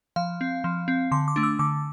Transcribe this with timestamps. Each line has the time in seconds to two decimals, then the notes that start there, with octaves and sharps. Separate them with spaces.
0.16 F3 F5
0.41 C4
0.64 F3
0.88 C4
1.11 D3 C6
1.28 D6
1.36 A3 D4
1.43 E6
1.59 D3 D6